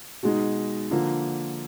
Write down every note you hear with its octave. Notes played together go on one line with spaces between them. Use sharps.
B2 G#3 D#4
D3 F3 A#3